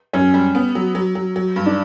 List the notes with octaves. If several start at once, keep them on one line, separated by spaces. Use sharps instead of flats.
F#2 C#4
G3
B3
F#3
F#3
F#3
F#3
G2
D4